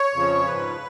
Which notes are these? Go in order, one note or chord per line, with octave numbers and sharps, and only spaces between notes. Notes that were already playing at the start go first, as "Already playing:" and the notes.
Already playing: C#5
F2 C#3 F3
G#2 F3 B4